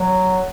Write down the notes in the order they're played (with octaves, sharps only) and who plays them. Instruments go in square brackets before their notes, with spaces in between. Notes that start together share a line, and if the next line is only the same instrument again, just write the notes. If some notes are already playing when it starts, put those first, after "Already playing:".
Already playing: [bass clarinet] F#3